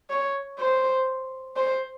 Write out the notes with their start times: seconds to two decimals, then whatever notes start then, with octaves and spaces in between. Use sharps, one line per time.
0.10 C#5
0.59 C5
1.56 C5